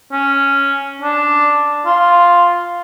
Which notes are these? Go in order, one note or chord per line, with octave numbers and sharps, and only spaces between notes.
C#4
D4
F4